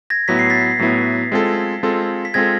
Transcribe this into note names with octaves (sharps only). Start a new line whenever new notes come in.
G#6 A#6
A2 F#3 B3 E4 B6
C7
A6 B6
A2 F#3 B3 E4
G#3 C4 F4 A4
G#3 C4 F4 A4
B6
G#3 C4 F4 A4 G#6 A#6